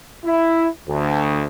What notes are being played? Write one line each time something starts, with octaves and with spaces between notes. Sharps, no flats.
E4
D2